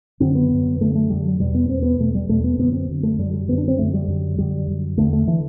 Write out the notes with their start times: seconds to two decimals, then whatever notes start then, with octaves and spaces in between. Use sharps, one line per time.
0.20 F#2 D3 C4
0.35 B3
0.50 F#2 D3
0.80 F#2 D3 A3
0.95 A3
1.10 F#2 D3 G3
1.25 F#3
1.40 E2 B2 G3
1.54 B3
1.69 E2 B2 C4
1.82 B3
1.99 E2 B2 A3
2.15 G3
2.29 E2 B2 A3
2.44 B3
2.59 F#2 D3 B3
2.74 C4
2.89 F#2 D3
3.03 A3
3.19 F#2 D3 G3
3.33 G3
3.48 F#2 D3 B3
3.58 D4
3.68 C4
3.79 F#2 D3 A3
3.94 G3
4.08 F#2 D3
4.38 F#2 D3 G3
4.68 F#2 D3
4.97 E2 D3 A3
5.13 A3
5.27 D3 E3